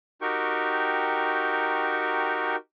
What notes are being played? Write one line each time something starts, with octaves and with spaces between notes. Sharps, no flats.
D#4 F#4 G4 A#4 G5 C#6